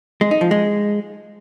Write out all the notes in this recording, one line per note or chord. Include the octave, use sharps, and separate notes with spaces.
G#3
D#4
F3
G#3